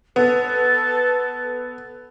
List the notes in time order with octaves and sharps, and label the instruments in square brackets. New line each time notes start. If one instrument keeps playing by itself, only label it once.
[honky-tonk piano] B3 [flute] A4